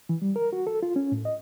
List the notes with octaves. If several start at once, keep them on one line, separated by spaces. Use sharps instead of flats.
E3
G3
A#4
F#4
A4
F4
C#4
A2
D#5